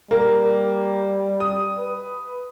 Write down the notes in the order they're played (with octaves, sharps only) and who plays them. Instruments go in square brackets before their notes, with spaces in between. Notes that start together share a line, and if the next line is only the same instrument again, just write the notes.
[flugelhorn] G3 [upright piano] A#3
[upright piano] D#6
[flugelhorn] B4